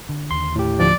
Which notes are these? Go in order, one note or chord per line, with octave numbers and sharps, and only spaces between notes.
D3
D#2 D3 C6
A2 G4
D2 F3 D5